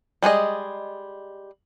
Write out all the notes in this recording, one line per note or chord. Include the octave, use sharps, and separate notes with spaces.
G3 G#3 G#4 D#5